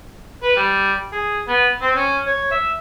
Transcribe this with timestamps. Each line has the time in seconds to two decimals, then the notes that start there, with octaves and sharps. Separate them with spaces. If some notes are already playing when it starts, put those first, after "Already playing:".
0.42 B4
0.56 G3
1.12 G#4
1.48 B3
1.81 C4
1.95 C#4
2.27 C#5
2.51 E5